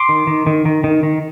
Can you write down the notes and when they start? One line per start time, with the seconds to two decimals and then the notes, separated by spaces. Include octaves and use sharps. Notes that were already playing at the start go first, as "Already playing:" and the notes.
Already playing: C6 D6
0.09 D#3
0.27 D#3
0.47 D#3
0.65 D#3
0.84 D#3
1.03 D#3